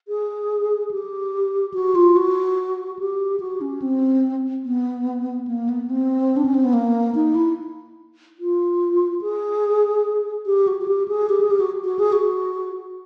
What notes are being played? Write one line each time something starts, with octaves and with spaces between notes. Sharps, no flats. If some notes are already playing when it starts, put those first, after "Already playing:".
G#4
G4
F#4
F4
F#4
G4
F#4
C#4
C4
B3
A#3
B3
C4
D4
C#4
C4
B3
A#3
D#4
E4
F4
G#4
G4
F#4
F#4
G4
G#4
G4
G#4
G4
F#4
F#4
G#4
F#4